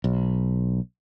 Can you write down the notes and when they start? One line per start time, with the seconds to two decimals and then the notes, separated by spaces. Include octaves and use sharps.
0.04 B1